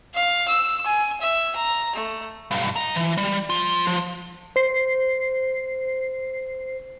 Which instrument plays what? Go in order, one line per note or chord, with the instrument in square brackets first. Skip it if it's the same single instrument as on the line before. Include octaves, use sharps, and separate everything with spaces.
[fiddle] F5
E6
G#5
E5
A#5
A3
[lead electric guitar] B1 G2
D#5 A#5
E3
G3
F3 F4
F3
[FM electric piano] C5 C7